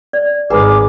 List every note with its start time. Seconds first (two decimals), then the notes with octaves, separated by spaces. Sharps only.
0.13 D5
0.50 G#1 G#4 B4 C5 A#5 B5 D6